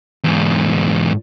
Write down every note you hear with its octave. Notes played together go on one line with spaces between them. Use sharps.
E2 G#2